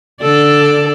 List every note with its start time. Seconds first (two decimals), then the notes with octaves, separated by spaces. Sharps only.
0.21 D3 A4 D5